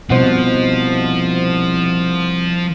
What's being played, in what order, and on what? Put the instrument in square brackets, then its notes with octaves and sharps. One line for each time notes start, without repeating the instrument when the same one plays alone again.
[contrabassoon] C2 [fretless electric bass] B2 [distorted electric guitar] F3 [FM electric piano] C5 D#5 F#5